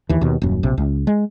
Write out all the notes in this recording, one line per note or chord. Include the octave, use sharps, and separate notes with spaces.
D#2 E3
D#2 B2
D#1 F#2
A#1 C3
C#2
G#3